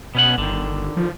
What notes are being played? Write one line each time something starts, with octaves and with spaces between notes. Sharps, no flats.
B2 B3 C#4 F#5
G1 D3 D#3
F3